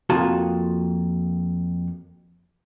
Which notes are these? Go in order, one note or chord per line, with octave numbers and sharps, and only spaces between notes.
F2 A#3 F4 F#4 A5